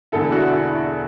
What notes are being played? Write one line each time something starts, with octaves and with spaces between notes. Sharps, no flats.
E1 E2 D3 E4 A4
D4 F#4
E4